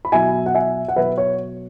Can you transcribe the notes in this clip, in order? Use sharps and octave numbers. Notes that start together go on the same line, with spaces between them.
B5
B2 F#3 E5 G#5
F#5
E5 G#5
F#5
B2 F#3 B4 E5
C#5